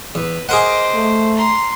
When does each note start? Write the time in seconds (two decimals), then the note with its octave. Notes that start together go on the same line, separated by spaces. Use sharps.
0.15 E2 B4
0.49 G#4 A#4 C5 D#5 F#5 D6
0.94 A3
1.37 A#5 C6